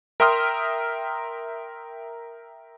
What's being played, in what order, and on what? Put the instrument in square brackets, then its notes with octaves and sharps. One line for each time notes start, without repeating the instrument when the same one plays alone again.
[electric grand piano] A#4 E5 G5 C6 D#6 F6